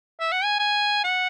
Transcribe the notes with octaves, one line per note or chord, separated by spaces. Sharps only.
E5
F#5
G#5
G#5
F#5